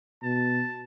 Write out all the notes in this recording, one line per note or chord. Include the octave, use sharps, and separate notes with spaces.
B2 A5